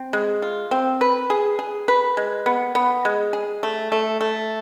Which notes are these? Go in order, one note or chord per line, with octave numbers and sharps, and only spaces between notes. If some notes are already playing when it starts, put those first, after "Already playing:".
Already playing: C4
G#3
F4
C4
B4
G#4
G#4
B4
G#3
B3
B3
G#3
G#4
A3
A3
A3